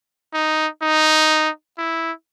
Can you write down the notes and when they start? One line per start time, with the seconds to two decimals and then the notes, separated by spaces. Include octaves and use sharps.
0.34 D#4
0.82 D#4
1.78 E4